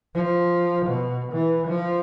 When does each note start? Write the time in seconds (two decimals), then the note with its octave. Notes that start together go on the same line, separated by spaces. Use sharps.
0.14 F3
0.86 B2
1.33 E3
1.67 F3